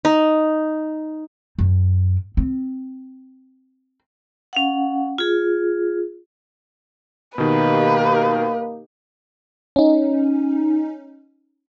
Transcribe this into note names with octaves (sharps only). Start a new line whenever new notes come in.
D#4
F#2
C4
C#4 F5 F#5
F4 G#4
B2 D#3 A#3 D#4 G4 B4
C#4 D#4